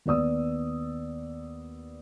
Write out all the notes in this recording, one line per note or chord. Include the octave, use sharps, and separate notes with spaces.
D#2 B3 D5 D#6 E6